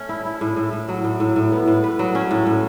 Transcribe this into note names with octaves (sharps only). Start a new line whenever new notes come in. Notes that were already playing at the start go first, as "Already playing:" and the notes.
Already playing: A3 C#4
E4
E4
A2
A2
A2
F#3
A2
A2
A2
B3
A2
B4
F#3
C#4
A2
A2